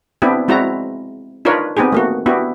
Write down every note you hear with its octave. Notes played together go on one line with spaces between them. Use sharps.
B3 C4 D4 E4 G4
G#3 C4 E4 F#4 D5 A#5
D4 D#4 F4 A#4 B4 C#5
B3 C4 D#4 G4 G#4
A3 A#3 F#4
B3 D4 E4 F#4 G4